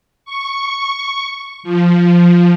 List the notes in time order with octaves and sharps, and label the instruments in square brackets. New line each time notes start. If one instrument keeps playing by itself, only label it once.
[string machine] C#6
F3